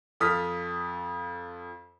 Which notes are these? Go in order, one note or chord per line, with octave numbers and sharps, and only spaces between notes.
F2 A4 D#6 F6 B6